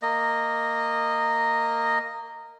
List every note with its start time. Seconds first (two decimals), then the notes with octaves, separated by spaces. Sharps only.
0.02 A#3 D#5